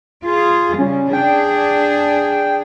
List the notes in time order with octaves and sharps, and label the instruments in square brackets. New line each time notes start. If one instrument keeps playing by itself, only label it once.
[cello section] F4 G#4
[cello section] C#3 G3 [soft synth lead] C#4
[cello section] D4 G#4 [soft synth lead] G5